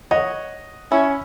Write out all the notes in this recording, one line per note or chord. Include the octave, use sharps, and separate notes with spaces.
C#5 D#5 F#5
C#4 E4